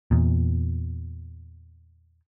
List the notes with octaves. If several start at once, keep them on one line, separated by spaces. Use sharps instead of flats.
E2 A#2